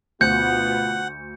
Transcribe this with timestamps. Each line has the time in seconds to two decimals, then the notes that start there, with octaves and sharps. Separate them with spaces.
0.21 D2 B2 B3 F4 F#5 G6 C#7